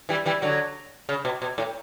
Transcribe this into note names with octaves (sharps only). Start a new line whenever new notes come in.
E3 G3
E3 G3
D3 F#3
C#3
B2
B2
A2